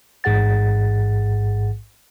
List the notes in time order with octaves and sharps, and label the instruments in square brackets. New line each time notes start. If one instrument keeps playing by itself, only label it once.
[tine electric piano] A1 G#2 G#4 F#5 A6